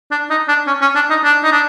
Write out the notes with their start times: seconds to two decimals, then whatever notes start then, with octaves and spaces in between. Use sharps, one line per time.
0.11 D4
0.30 D#4
0.48 D4
0.67 C#4
0.81 C#4
0.95 D4
1.10 D#4
1.24 D4
1.44 D#4
1.52 D4